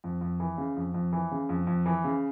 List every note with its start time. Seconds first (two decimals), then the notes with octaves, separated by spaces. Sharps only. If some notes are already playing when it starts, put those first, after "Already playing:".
0.04 F2
0.21 F2
0.40 E3
0.58 C#3
0.76 F2
0.94 F2
1.13 E3
1.31 C#3
1.49 F2
1.67 F2
1.86 E3
2.04 C#3